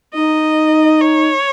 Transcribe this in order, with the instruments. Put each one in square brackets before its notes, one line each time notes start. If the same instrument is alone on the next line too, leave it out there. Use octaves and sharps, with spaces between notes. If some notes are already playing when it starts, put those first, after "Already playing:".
[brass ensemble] D#4 [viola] D#5
[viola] C#5